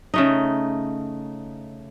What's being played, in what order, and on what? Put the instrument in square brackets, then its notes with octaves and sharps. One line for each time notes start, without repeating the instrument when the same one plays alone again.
[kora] C#3 A3 D#4